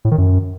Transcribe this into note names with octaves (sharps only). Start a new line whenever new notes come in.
A2
D#3
F#2